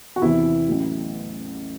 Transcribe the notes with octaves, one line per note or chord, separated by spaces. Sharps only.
F#4
E2 C3 E3 E4
A1 A2 F#3